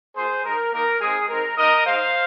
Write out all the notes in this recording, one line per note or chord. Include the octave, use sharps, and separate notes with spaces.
A#3 F4 G#4 C5
G#3 D#4 A#4
A#3 D#4 A#4
G#3 C4 D#4 G#4
G#3 C4 D#4 A#4
A#3 D#4 A#4 D#5
G#3 D#4 C5 F5